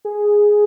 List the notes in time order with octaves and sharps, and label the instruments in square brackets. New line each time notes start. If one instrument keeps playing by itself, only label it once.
[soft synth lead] G#4